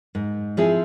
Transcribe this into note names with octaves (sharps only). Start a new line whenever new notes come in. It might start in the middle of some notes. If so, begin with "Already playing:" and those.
G#2
F3 C4 E4 G#4